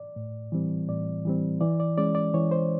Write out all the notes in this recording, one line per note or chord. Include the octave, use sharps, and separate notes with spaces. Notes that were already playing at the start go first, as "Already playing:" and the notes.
Already playing: D5
A2
E3 G3 C4
A2 D5
E3 G3 C4
E3 D5
D5
G#3 C#4 D5
D5
E3 C#5
C5